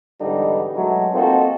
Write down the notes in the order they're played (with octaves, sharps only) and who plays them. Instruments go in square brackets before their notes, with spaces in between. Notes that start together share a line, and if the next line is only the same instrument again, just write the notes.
[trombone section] G#2 D3 E3 G3 B3 D#4
B2 F#3 G#3 A3
A#3 C4 D#4 F4 F#4 A4